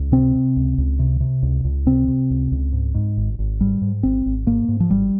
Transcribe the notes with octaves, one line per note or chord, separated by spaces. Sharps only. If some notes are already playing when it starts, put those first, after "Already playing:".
Already playing: C#2
C3 C4
C3
C#2
C#2
C3
C3
C#2
C#2
C3 C4
C3
C#2
C#2
G#2
G#2
G#1
G#1
G#2 G3
G#2
G#1 C4
G#1
G#2 A#3
G#2
F3
G#1 G3